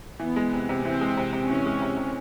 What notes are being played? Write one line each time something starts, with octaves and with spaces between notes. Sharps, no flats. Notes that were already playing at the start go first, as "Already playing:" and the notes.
E3 B3
G#3
C3
C3
E3 C4
G#3
C3
C3
E3 C#4
G#3
C3
C3